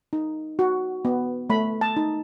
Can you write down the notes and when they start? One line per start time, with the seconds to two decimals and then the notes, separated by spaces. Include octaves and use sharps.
0.13 D#4
0.59 F#4
1.05 B3
1.50 A3 B5
1.81 A5
1.97 D#4